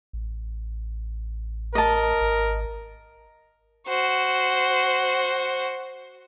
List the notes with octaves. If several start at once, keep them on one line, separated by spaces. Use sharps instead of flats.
A1
A#4 D#5 A5
G#1
F#4 C5